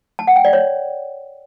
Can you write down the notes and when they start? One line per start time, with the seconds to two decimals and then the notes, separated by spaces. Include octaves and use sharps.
0.19 A5
0.27 F#5
0.36 G5
0.45 D5
0.53 C#5